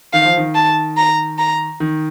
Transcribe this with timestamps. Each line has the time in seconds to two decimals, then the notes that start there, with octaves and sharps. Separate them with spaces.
0.13 D#3 F5
0.25 F3
0.37 D#3
0.55 A5
0.97 A#5
1.39 A#5
1.80 D#3